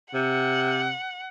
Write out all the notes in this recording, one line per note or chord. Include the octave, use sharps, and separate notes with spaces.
C3 F#5